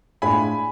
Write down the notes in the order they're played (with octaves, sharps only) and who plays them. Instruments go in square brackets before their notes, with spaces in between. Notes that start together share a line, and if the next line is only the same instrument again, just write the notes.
[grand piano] A2 G#3 D4 F4 G#5 B5